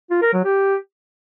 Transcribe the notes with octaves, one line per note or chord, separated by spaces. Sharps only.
F4
A#4
F#3
G4